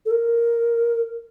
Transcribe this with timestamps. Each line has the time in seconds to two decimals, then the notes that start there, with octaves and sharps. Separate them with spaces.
0.06 A4
0.11 A#4